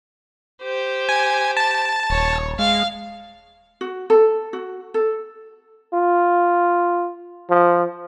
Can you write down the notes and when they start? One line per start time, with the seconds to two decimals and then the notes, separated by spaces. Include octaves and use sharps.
0.62 G4 C5
1.09 G#5
1.57 A5
2.10 D#1 C#5
2.59 G#3 F5
3.81 F#4
4.10 A4
4.53 F#4
4.94 A4
5.93 F4
7.50 F3